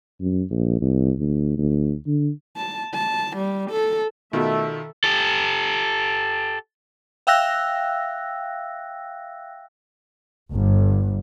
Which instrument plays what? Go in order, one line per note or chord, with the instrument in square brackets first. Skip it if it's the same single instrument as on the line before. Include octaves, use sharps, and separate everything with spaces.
[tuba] F#2
A#1
C2
D2
D2
D3
[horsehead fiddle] A5
A5
G3
A4
[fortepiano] B2 [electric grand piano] D#3 F4 [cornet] A3 [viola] A4 E5
[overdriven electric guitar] G4 A4
[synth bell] E5 F5 G5 E6 F#6 A#6
[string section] G1